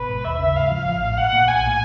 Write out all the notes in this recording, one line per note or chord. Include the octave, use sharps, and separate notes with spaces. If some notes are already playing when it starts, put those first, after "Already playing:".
Already playing: G#1 B2 B4
G#2
D#2 E5
C#3
G#2 F5
F3
A1
A2
A#1 F#5
A#2
B1 G#5
A2